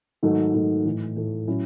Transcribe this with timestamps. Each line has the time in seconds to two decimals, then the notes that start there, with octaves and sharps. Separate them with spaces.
0.23 G#2 D#3 F#3 A3
0.54 G#2 D#3 F#3 A3
0.85 A2 E3 A3
1.16 A2 E3 A3
1.47 A2 F#3 C#4 E4